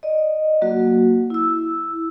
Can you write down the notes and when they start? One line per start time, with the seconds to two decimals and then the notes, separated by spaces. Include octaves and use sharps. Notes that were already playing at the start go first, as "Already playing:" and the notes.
0.03 D5 D#5
0.62 F#3 A#3 F#4
1.30 E4 E6